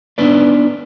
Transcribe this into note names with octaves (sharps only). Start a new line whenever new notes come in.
B3 D4 D#4 B4 D5